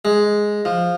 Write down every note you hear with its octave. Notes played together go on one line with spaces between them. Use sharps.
G#3
F3